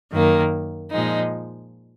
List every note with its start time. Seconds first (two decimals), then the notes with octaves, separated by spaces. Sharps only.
0.12 F#2 D#3 A#3
0.91 A#2 F3 G#3 D#4